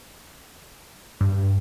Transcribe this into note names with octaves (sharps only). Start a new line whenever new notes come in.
G2